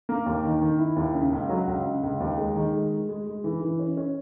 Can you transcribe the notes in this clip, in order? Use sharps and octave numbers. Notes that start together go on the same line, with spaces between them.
A#3
D#2
D#3
D#3
E4
D#2
C#3
C#2
F#3
C#2
C#3
C#2
D#2
G#3
D#3
G#3
G#3
G#3
G#3
E3
E3
C#4
C#4